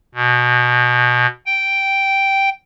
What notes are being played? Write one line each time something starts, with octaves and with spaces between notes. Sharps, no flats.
B2
G5